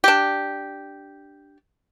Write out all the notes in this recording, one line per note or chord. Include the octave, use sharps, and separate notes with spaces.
D4 G4